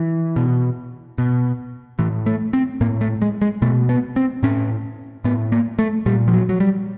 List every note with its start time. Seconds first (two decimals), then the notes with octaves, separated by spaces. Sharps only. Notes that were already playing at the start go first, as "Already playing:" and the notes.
Already playing: E3
0.36 B2
1.18 B2
1.99 A2 E3
2.26 A3
2.53 C4
2.81 A2 A#3
3.01 A3
3.22 G#3
3.42 G#3
3.62 B2 A3
3.89 B3
4.16 C4
4.43 A2 C#4
5.24 A2 B3
5.52 A#3
5.79 A3
6.06 A#2 G3
6.28 F3
6.34 F#3
6.49 F#3
6.60 G3